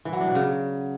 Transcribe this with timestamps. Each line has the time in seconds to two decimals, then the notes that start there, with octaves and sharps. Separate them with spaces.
0.05 E3
0.13 F#3
0.20 D4
0.28 B2
0.35 C#3